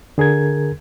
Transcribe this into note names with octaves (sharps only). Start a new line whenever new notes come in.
D3 G#4 A#4 G#6